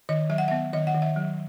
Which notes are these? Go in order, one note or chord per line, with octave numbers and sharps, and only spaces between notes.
D#3 D#5
F#3 E5
F#5
B3 E5
D#3 D#5
F#5
D#3
E5
F#3